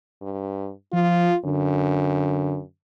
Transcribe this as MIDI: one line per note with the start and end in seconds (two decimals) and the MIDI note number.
0.22 0.71 43
0.93 1.30 53
0.93 1.36 65
1.45 2.63 42
1.45 2.60 50